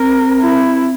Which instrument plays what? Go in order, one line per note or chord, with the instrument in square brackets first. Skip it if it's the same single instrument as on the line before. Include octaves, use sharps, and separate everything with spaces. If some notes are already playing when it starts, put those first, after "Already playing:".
Already playing: [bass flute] C4 [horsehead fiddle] A#4
[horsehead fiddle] E4